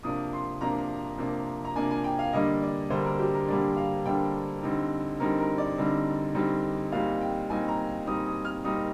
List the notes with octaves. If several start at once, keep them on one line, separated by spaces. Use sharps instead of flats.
C3 F3 A#3 D4 D#6
C6
C3 F3 A#3 D4 A#5
C3 F3 A#3 D4
A#5
C3 F3 A#3 D4 G#5
G#5
G5
F5
D3 G3 A#3 D4 D#5
D5
D3 G3 A#3 D4 C5
A#4
G4
A#4
D3 G3 A#3 D4 D5
F5
D3 G3 A#3 D4 G5
D3 G3 C4 D#4
D3 G3 C4 D#4 A#4
A#4
D5
D3 G3 C4 D#4
D3 G3 C4 D#4
A#2 G3 C4 D#4 F5
G5
A#2 G3 C4 D#4 G#5
A#5
A#2 G3 C4 D#4 D#6
D#6
F6
A#2 G3 C4 D#4 D#6